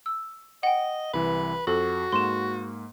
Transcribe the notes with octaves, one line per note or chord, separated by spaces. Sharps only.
E6
D#5 F#5 G5
C2 E3 B4
F2 F#4 A4
G#2 A#3 C6 E7